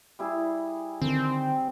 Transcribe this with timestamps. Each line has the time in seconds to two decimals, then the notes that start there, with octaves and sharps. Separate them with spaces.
0.19 G3 E4 G#4
1.02 D3 D#3 C4